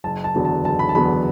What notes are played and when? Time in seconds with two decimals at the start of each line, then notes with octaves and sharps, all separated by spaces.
0.04 F#1 A5
0.24 A5
0.34 E2 D3 F#3 B3
0.45 A5
0.64 F#1 A5
0.79 B5
0.89 A5
0.95 E2 D3 F#3 B3 B5